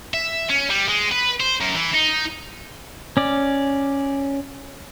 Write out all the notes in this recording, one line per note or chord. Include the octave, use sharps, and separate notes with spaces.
E5
C#4
G3
G#3
B4
C5
F#2
E3
D#4
C#4 D5